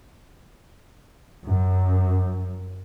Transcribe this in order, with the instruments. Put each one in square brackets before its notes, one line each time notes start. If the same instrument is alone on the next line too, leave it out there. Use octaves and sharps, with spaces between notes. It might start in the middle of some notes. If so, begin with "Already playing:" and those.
[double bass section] F#2